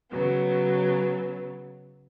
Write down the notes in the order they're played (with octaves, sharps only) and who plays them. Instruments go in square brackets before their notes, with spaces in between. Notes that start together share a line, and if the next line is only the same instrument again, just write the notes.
[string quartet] C#3 F#3 B3